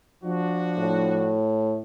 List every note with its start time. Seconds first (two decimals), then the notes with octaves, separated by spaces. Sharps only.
0.23 F3 D4 F#4
0.78 A2